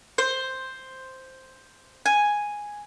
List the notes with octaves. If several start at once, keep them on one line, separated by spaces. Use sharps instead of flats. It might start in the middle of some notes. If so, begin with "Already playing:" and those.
C5
G#5